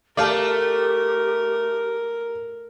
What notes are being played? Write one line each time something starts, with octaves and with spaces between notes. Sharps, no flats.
A3 G4 A#4 D5 F5 A5